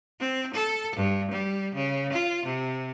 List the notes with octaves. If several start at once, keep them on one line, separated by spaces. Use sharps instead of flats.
C4
A4
G2
G3
C#3
F4
C3